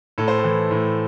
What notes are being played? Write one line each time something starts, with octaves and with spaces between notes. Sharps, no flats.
A2 A4
C5
A4
E3
A2